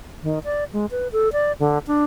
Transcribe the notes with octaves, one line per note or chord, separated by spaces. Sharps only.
D#3
D5
G#3
B4
A4
D5
D3
D4